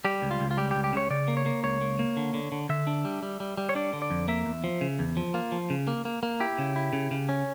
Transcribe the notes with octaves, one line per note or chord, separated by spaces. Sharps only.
G3 G4
C#2
F4
C#2
F4
G3 G4
G4
C#2
G4
C#3 C#5
C#3 D5
A#3
C#5
A#3
C#2 C#5
A#3
A#3
D3
D3
D3
D3 E5
D4
G3
G3
G3
G3
C#5
D4 D5
D3
D5
F2
A#3 E5
E2
F3
C#3
E2
F3
A#3 F4
F3
C#3
A#3
A#3
A#3
E4 G4
C#3
E4
C#3
C#3
C#4